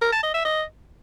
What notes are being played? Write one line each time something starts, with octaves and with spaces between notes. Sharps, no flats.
A#4
A5
D#5
E5
D#5